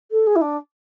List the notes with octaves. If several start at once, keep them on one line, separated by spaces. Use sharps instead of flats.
A4
G#4
E4
D4